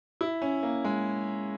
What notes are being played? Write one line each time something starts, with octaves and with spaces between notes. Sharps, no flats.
E4
C#4
A#3
G#3